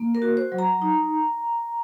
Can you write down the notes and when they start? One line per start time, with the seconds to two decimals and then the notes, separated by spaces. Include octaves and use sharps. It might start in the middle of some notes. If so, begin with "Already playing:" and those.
Already playing: A#3
0.15 A#4
0.22 F#4
0.37 C5
0.52 F#3
0.59 A#5
0.82 D#4